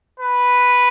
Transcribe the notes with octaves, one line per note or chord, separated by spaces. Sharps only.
B4